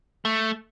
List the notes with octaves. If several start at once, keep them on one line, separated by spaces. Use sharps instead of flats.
A3